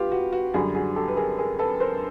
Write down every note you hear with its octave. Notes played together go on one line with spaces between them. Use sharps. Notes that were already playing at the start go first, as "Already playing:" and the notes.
Already playing: F4 G4 B4
F#4
F#4
F#2 D3 G3 F#4 G#4
F#4 G#4
G4 A4
B4
G#4 A#4
G#4 A#4
A4 B4
A#4 C5